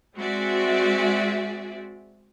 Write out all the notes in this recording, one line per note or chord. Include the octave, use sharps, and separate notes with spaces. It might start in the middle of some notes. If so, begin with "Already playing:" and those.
G#3 C4 F#4 G#4 D5 E5